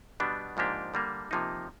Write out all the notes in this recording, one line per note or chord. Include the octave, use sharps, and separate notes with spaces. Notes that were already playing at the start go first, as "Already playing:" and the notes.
B2 G3 B3 D4 G4
G#2 F3 A#3 D4 G4
D3 G3 A#3
C3 F3 A#3 D#4